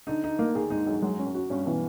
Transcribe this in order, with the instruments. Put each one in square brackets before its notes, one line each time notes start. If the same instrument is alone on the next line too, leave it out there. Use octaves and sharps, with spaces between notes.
[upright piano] D3 [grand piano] D#4
[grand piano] D#4
A#3
[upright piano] D#2 D#3 [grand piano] G#4
[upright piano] G#2 G#3 [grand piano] D#4
[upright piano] F#2 F#3 [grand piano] G#4
[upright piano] F#2 F#3 [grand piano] G#3
[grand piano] C#4
[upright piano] F#2 F#3
[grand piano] F#4
[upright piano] G2 G3 [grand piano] C#4
[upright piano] B2 B3 [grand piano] E3